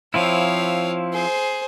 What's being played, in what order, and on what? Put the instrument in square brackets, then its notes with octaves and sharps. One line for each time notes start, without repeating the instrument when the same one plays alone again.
[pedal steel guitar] F3 C4 E4 [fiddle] C#5 F5
[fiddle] G#4 C5